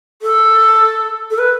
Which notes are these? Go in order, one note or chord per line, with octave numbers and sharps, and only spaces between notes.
A4
A4
B4